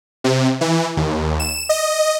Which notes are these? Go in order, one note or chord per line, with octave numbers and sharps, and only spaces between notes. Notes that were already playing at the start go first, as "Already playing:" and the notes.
C3
E3
D#2
E7
D#5